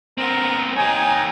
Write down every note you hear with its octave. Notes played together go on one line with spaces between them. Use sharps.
B3 C4 A#4
D#4 G4 C#5 G#5